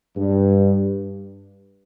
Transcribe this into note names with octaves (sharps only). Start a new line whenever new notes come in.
G2